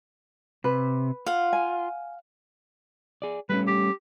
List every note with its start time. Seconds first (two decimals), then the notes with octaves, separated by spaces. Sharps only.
0.64 C3 B4
1.27 F4 F5 F#5
1.53 G#5
3.22 G#4 D5
3.49 G3 A3 C#4 B4
3.67 G4